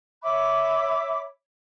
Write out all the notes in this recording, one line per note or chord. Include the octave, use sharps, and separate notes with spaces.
C#5 E5 B5 D6